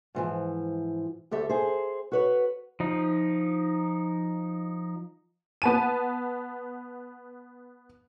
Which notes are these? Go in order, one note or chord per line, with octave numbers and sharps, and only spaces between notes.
G#2 E3 F3
D2 G4 A4 E5
G#4 C5
F#4 B4 C#5
F3 D#4
B3 A5 D#7